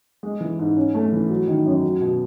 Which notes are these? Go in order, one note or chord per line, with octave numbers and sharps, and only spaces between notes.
G#3
E3
G#2
C#4
A3
E3
F#3
D#3
F#2
F#3
B2